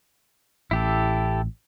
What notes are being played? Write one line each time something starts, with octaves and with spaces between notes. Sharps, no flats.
A1 E4 G4 A4